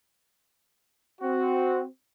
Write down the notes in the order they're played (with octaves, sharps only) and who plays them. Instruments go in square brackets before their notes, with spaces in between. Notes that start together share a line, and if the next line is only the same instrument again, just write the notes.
[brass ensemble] C4 F#4